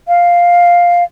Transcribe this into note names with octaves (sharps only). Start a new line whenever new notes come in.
F5